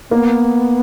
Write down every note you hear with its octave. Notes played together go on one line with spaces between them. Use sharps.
A#3 B3